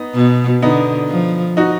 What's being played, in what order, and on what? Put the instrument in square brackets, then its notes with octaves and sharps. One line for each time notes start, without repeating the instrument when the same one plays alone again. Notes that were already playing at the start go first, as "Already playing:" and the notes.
Already playing: [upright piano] B3 D#4
[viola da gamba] B2
[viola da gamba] D3 [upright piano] B3 D#4
[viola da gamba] F3
[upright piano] D#4 F#4